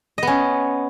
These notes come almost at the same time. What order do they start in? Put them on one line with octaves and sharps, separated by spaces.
D#5 B3 C#4